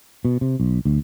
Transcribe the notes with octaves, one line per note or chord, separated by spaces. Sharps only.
B2
C3
B1
D2